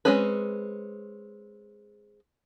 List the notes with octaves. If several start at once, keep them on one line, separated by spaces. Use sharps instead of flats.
G#3 C4 C#4 G#4 B4